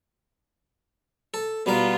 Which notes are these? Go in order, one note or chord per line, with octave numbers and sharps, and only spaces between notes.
A4
B2 G3 B3 F4 A#4